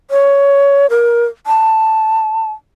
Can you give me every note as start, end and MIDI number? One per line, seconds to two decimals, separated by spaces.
0.11 0.86 73
0.90 1.25 70
1.47 2.52 81